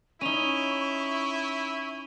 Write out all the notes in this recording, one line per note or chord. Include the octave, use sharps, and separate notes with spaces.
C#4 D#4 E4 C#6 D#7 F7 G7